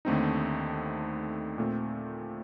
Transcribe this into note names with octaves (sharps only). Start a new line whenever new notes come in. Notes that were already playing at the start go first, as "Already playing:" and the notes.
D#2 D3 A3 C4 D#4
A#2 A3 C4